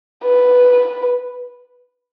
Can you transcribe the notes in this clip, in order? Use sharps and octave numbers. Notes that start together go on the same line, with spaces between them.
B4